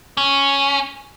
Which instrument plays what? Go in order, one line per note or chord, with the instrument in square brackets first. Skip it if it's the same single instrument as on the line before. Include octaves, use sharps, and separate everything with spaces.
[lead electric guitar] C#4